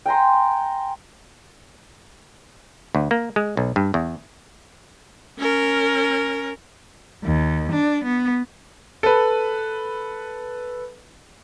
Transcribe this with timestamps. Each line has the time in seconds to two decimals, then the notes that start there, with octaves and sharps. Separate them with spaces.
0.06 G5 G#5 A#5 C6
2.95 D2
3.11 A#3
3.36 G#3
3.57 B1
3.76 G2
3.94 E2
5.39 C#4 A#4
7.24 D#2
7.72 D4
8.04 B3
9.03 A4 B4